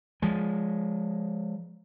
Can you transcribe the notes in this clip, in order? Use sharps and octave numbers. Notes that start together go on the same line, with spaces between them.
F3 G#3